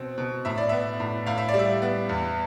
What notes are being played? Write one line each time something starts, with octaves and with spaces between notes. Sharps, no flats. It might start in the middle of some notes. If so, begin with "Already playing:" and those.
Already playing: B2 C4
B2
A2 E5
D5
B3 E5
A2
A2 F5
E5
D5
G3
E5
B3
E2